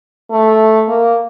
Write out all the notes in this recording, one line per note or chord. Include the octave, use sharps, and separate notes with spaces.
A3
A#3